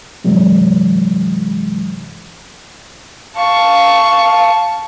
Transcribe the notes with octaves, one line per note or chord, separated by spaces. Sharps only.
G2 C3 E3 F#3 G#3
F5 A5 C#6